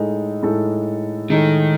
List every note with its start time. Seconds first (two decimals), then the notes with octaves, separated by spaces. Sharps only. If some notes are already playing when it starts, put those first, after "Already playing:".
Already playing: A2 G#3 D#4 A4
0.43 A2 G#3 D#4 A4
1.30 A2 D#3 G#3 D#4 A4